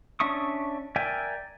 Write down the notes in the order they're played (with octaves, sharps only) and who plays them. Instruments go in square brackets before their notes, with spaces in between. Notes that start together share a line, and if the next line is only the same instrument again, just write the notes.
[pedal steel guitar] C#4 D4 E5 C#6 D#6
A#4 D5 E5 G5 G#5